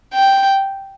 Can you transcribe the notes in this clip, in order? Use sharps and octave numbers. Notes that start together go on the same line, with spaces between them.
G5